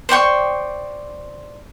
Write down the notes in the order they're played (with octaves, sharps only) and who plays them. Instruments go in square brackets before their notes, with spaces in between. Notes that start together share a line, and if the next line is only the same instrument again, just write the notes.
[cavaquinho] C5 D5 G5 C#6